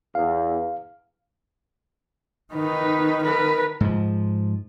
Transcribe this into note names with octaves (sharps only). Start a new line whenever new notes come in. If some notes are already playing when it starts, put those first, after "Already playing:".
E2 F5
D#3 D#4 B4
A#4 B4
G#2 F3